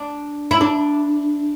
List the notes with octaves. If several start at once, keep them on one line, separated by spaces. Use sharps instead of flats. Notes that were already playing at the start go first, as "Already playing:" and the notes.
Already playing: D4
E4
D4